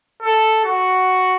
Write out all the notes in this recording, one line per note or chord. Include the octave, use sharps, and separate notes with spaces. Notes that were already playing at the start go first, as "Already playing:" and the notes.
A4
F#4